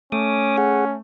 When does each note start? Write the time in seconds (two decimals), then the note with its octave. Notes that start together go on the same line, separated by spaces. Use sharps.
0.12 A3 C#4 D6 D#6
0.58 G#4 F#5